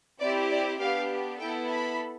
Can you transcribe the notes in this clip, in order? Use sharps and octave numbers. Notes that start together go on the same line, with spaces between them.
C4 E4 G4 D5
D5
B3 D4 G4 F5
B3 E4 A4 G5
B5